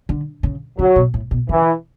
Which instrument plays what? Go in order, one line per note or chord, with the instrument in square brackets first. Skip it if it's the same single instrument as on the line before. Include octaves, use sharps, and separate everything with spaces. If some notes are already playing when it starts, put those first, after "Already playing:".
[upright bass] D3
C#3
[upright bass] C#3 [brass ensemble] F#3
[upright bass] B2
A2
B2
[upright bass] C#3 [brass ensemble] E3